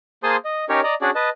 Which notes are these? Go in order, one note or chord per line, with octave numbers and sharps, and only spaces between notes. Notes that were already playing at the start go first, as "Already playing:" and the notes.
A#3 G#4 C5 A5 C6 D#6
D#5
C#4 D#4 G4 A#4 C#5
D5 D#5 A#5
C#4 D4 F#4 G#4 D5
B4 D#5 A5